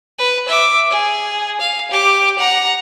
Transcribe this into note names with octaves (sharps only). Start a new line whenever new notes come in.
B4
E5 D6
G#4
F5
G4 D6
F#5 A#5